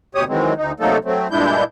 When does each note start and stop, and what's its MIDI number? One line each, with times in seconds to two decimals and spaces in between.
0.15 0.24 38
0.15 0.24 47
0.15 0.24 67
0.15 0.24 73
0.15 0.24 87
0.28 0.54 51
0.28 0.54 52
0.28 0.54 54
0.28 0.54 56
0.28 0.54 60
0.57 0.72 38
0.57 0.72 63
0.80 0.98 48
0.80 0.98 54
0.80 0.98 57
0.80 0.98 58
0.80 0.98 63
0.80 0.98 69
1.05 1.28 54
1.05 1.28 57
1.05 1.28 60
1.31 1.64 43
1.31 1.64 46
1.31 1.64 56
1.31 1.64 62
1.31 1.64 64
1.31 1.64 91